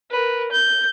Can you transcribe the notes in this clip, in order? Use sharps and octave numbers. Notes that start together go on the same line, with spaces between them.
A#4 B4
G6